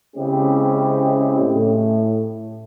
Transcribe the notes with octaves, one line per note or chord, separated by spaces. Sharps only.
C#3 G#3 C4 C#4 E4 G4
A2